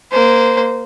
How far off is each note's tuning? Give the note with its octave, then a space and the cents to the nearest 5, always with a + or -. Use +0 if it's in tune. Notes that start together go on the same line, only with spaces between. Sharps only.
A#3 +0 C5 -20